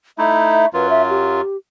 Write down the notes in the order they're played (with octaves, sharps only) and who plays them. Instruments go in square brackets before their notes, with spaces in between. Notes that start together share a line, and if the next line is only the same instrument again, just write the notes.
[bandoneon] A3 D#4 E4 [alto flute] E5
[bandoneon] F#2 F#3 F4 [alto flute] B4
[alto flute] E5
G4